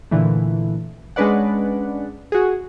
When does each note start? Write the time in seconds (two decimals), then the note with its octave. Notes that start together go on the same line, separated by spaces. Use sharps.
0.11 A#2 D3 E3 A3
1.16 G#3 C#4 D4 B4 D5 F#5
2.32 F#4 G#4